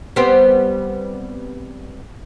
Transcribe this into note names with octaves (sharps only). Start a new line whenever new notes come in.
G3 B3 C4